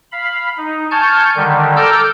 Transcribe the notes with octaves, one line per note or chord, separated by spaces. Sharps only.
F5 B5
D#4
G#5 A5 C#6 F6 G6
D3 D#3 G3
A4 A#5 D6 E6 F6 G6